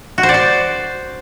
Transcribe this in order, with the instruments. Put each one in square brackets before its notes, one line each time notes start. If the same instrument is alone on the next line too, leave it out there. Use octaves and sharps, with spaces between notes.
[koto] F#4
C5
D5
C5